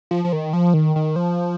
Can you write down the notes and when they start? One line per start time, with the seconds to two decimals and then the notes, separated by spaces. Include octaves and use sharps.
0.11 F3
0.25 F3
0.33 D#3
0.53 F3
0.74 D#3
0.96 D#3
1.16 F3